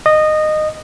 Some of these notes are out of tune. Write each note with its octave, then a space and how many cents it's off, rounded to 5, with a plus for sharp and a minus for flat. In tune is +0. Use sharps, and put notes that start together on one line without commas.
D#5 -15